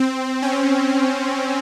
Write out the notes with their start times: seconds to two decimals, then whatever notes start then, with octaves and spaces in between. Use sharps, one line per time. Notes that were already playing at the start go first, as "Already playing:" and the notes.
Already playing: C4
0.42 C#4